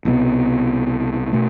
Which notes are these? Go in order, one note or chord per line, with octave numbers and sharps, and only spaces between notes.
C2 B2 G3 B3
B2 A3